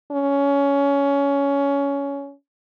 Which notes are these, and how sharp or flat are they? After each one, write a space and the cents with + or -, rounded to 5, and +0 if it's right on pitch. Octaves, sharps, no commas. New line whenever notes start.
C#4 +20